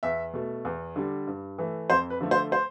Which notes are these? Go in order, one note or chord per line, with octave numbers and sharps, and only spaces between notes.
E2 E5
B2 A3
E2
D3 G3
G2
E3 A3
F2 C5
B4
D3 F3 A3
C5
C5